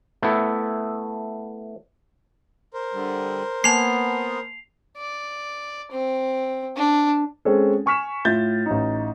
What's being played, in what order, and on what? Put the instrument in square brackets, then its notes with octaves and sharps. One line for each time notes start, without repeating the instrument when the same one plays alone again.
[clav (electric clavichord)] A3 B3 E4
[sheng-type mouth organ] A#4 C5
[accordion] D3 G3
[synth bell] A#3 G#5 A5 [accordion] B3 [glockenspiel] C7 F7
[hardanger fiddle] D5
C4
D4
[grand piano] G#3 C4 C#4 G#4 A4
G#5 C#6 F6 B6 E7
A2 F4 E5 G6 A6
A1 D#4